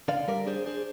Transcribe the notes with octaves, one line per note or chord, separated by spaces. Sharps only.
D3 D5 F5
G3 A#4 D5
D4 G#4 C5
D4 G#4 C5